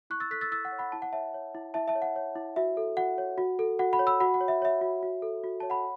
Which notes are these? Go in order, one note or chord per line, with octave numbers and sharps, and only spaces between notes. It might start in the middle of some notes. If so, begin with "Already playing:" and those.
E4 C#6 F#6
E6 A6
A4 F#6 B6
E6 A6
E4 E6 A6
F#5
C#5
F#5 B5
E4 A5
F#5
C#5 E5 A5
C#5
E4
E4 E5 A5
E5 A5
C#5
F#5
C#5
E4
F#4 E5
A4
F#4 F#5
C#5
F#4
A4
F#4 F#5
F#5 B5
C#5
B5 E6
F#4 F#5 B5
F#5
C#5
E5
C#5 E5
F#4
F#4
A4
F#4
C#5 A5
F#5 B5